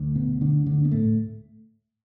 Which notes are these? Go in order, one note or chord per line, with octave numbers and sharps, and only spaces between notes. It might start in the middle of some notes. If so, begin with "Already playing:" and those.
Already playing: D2 D3
B2 B3
D3 D4
D3 D4
B3
A2 A3